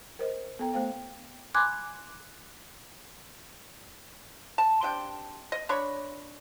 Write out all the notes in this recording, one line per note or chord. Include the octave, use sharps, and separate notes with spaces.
A#4 C5 D#5
B3 A4 G5 A#5
A3 B3 C5 F5 G5
G#5 B5 C6 D6 F#6 G#6
A5
C3 D4 G5
D#5
D4 C#5 B5 C#6